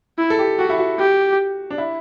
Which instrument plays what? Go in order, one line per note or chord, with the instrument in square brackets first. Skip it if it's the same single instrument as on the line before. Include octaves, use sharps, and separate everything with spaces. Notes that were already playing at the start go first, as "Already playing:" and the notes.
[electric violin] E4
[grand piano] A4
G4
[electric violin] F#4 [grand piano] G4
[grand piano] E4
F#4
[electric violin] G4
[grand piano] D4
E4